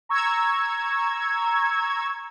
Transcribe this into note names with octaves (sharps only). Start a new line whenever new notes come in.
A#5 C#6 E6 G#6